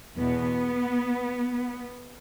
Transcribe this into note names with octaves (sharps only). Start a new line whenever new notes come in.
E2 B2 B3